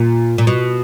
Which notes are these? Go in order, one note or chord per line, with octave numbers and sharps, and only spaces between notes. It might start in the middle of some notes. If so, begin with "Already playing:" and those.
Already playing: A#2
A#2
B2